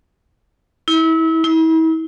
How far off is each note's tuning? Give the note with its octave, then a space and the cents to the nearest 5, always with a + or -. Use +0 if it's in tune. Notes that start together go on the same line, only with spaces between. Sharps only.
E4 -30
E4 -40